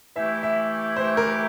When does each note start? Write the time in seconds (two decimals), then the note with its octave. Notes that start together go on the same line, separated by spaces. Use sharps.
0.16 E3 A3 E4 G4 E5
0.43 E5
0.96 E3 A3 E4 G4 C5
1.17 A#4